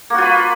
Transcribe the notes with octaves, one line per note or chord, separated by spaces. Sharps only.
A#3 F4 F#4 B4